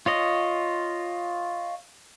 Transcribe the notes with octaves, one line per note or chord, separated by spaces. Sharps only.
F4 C#5 D#5